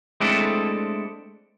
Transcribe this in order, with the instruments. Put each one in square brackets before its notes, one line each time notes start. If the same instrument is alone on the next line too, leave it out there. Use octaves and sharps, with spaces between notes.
[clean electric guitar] G#3 A3 C4 D4 E4 A4